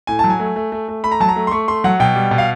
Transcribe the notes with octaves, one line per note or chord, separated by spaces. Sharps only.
A2 G#5
A5
F#3
G#5
A3
A3
A3
A3
A3 B5
A#5
F#3 A5
A#5
A3
C6
A3 C#6
A3 C6
F#3 F#5
B2 G5
G3
B2
F5